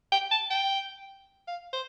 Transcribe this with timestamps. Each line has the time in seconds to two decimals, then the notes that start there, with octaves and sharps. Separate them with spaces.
0.12 G5
0.31 A5
0.50 G5
1.48 F5
1.73 C5